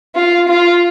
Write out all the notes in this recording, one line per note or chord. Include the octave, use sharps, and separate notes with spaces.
F4
F4